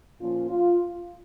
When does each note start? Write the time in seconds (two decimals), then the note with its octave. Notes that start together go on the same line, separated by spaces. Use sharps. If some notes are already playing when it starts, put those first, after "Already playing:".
0.20 A#2 F3 A#3 C#4 F4
0.50 F4